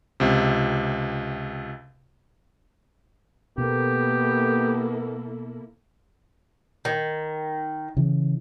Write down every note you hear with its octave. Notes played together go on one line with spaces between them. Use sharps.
C#2 C3
B2 A#3 B3 E4 G4 A4
D#3
C#3 E3